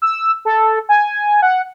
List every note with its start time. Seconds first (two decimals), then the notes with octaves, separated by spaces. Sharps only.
0.02 E6
0.45 A4
0.89 G#5
1.42 F#5